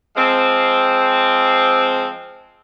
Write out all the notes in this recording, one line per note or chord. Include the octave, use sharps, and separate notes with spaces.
F3 G#3 C4